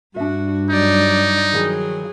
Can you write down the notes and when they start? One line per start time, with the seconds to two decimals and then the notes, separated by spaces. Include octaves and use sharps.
0.16 G2 D4 F#4 E5
0.70 F#3 D#4 D5
1.53 D#3 F3 F#3 E4 G#4